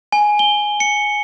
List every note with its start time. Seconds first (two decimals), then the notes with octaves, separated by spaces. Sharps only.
0.12 G#5
0.39 G7
0.80 C#7